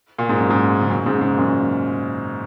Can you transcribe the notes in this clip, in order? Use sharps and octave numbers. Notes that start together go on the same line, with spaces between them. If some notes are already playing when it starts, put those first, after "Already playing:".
A#2
G#2
F#2
G#2
C#3
F#2 A#2
G#2 C#3
G#2
F#2 A#2